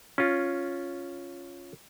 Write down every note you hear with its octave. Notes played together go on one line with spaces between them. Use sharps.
C#4 F4